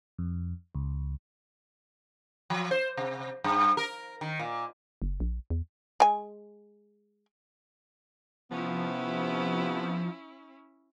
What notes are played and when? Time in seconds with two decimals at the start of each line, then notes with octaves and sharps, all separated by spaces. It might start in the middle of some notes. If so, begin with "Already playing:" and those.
0.18 F2
0.75 C#2
2.50 F3
2.71 C5
2.97 C3
3.44 G2
3.77 A#4
4.21 D#3
4.39 A#2
5.02 F#1
5.20 A#1
5.50 E2
6.00 G#3 G#5
8.51 C3 F3 B3 C#4 E4